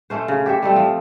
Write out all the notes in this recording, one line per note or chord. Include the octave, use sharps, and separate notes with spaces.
A3 C#4 C5
C#3
G4 C5 C#5 E5
G3 A3 C4
F3